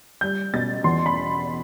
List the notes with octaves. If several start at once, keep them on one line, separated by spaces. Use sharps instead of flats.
G3 G6
B2 A6
E2 C6
B5